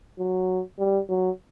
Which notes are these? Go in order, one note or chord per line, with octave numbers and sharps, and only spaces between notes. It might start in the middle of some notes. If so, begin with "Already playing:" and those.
F#3
G3
F#3